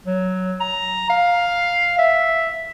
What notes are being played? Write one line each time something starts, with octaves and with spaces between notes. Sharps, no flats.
F#3
A#5
F5
E5